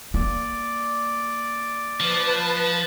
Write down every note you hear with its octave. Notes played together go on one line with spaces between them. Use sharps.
A#3 D5
F3 B4 A5